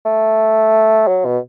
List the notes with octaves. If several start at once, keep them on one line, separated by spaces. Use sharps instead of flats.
A3
F#3
B2